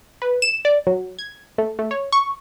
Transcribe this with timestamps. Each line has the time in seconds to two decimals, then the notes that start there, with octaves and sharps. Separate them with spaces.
0.22 B4
0.42 E7
0.65 D5
0.87 F#3
1.19 G#6
1.58 A3
1.79 A3
1.91 C#5
2.12 C#6